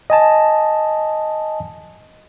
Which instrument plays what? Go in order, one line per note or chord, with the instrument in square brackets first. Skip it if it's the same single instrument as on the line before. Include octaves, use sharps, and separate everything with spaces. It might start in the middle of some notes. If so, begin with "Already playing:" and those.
[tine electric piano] D#5 G#5 A5